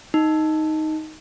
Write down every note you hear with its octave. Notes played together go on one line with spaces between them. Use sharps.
D#4